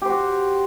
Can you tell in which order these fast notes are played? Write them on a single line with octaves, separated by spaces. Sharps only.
G4 C5 F#4